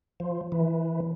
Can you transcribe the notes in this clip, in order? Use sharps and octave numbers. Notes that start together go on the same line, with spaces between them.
F3
E3